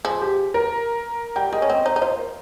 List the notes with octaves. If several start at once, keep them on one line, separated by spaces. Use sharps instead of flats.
F3 G#4
G4
A#4
G3 G5
G#3 D#5
C#4 C#5
C4 D#5
D#4 C5
D#4
F4 C5
A#4